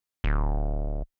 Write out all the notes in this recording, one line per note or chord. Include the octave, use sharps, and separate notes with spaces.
D1